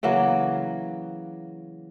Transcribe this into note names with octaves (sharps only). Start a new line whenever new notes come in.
C#3 E3 F#3 A#3